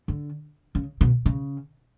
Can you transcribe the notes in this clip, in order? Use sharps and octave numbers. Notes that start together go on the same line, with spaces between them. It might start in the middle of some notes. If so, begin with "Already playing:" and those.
D3
C#3
B2
C#3